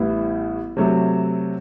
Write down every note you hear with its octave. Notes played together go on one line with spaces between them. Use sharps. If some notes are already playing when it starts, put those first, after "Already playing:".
Already playing: A1 A2 G3 B3 E4
C3 F#3 A3